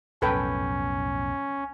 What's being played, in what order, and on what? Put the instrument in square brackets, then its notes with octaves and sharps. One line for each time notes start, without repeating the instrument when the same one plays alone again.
[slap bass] B1 F2 A2 [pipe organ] C#4 [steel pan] A4 B4 G5